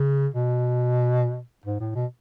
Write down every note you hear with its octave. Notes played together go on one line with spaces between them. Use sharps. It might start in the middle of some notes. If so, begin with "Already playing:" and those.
Already playing: C#3
B2
G#2
A2
B2